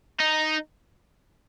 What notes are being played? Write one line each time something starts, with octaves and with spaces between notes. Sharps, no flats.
D#4